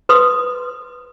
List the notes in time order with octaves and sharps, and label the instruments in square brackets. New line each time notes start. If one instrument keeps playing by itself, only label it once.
[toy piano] B4 C6 D#6